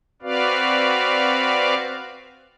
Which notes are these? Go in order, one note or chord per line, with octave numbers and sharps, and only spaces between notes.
C4 F#4 B4 D5 F5